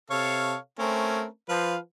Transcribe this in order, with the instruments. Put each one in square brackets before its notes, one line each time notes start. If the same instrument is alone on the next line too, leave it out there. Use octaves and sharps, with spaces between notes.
[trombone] C3 [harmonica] A4 C#5 F5
[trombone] A3 [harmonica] C4 C#4 A#4
[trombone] F3 [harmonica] B4 F5